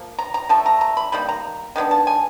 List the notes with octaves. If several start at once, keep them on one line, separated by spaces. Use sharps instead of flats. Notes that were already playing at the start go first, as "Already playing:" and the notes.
Already playing: F3 A#3
A#5
A#5
F3 A3 A5
A#5
A#5
B5
D#3 G3 A#3 B5
A#5
D#3 G#3 B3 D4
A5
G#5